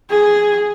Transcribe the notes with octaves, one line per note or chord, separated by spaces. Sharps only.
G#4